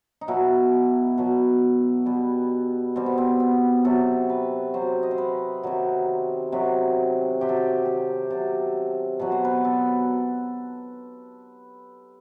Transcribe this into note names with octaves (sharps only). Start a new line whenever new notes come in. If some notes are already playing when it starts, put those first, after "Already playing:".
D#4
B2 F#3 E4
B2 F#3
B2 G3 B3
B2 G3 C4
B3
C4
B3
C3 F#3 A4
B4
C3 F#3 C5
D#5
C5
B4
C3 D#3 F#3
C3 D#3 F#3
C3 F#3 G4
A4
G4
G4
C3 F#3 A4
B2 F#3 B4
C5
B4
A4